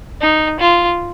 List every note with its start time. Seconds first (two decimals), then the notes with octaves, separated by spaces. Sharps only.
0.21 D#4
0.60 F4